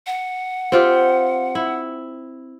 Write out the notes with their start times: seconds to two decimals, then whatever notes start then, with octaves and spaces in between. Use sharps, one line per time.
0.06 F#5
0.72 C4 F4 G4
1.55 E4